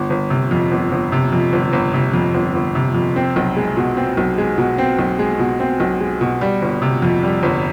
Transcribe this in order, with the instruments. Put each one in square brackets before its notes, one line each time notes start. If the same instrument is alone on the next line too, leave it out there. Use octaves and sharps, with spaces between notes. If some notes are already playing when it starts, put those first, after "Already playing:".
Already playing: [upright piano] G1
G1
C3
F2
G1
G1
C3
F2
G1
G1
C3
F2
G1
G1
C3
F2
C4
B1
G#3
B2
C4
B1
G#3
B2
C4
B1
G#3
B2
C4
B1
G#3
B2
G3
G1
C3
F2
G3
G1